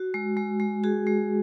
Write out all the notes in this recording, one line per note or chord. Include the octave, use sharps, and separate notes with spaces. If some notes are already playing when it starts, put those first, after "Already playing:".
Already playing: F#4
G#3
G#3
G#3
F#4 G#4
G#3